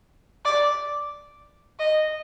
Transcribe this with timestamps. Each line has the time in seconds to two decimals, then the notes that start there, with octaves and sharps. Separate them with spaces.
0.45 D5
1.79 D#5